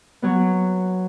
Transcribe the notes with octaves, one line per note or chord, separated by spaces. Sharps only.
F#3 B3 F#4